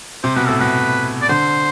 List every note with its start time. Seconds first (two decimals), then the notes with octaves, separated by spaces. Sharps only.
0.23 C3 C5
0.36 B2 B4
0.47 A2 A4
0.60 B2 B4
1.22 D5
1.29 D3 C5